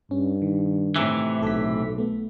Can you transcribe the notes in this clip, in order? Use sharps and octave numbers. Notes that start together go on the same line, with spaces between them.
G2 C#4
D#3
A2 C3 E3
B1 A4 B6
A3 B3